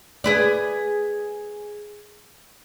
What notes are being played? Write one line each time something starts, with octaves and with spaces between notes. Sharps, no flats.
G#4 B4 D5